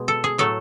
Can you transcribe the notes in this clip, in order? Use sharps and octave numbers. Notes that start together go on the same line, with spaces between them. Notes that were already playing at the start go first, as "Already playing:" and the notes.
Already playing: B2 G#3
A4
G#4
A2 F#3 A3 A4